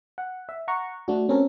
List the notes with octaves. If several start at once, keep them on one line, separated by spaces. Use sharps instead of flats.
F#5
E5
F#5 A#5 C#6
A3 D4 F#4
C4 C#4 A4 A#4